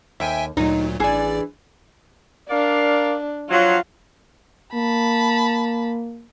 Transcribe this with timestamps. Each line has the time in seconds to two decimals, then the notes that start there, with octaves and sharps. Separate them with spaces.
0.20 D#2 E5 G5 G#5
0.57 D2 A#2 F#3 D#4
1.00 A1 E3 D4 G#4 D5
2.49 D4 A#4 D5 F5
3.50 F3 F#3 F4 C6
4.75 A#3 A5 B5